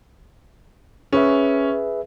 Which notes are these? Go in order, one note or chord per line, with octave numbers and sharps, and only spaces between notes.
C#4 G#4 B4 E5